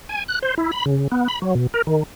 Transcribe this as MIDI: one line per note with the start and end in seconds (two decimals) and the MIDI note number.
0.09 0.24 80
0.28 0.39 90
0.42 0.54 72
0.58 0.71 64
0.72 0.85 83
0.86 1.08 49
1.12 1.28 59
1.28 1.39 83
1.42 1.54 54
1.55 1.67 47
1.74 1.82 70
1.87 2.03 51